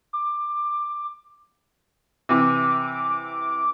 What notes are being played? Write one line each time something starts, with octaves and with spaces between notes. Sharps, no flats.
D6
C3 E3 D6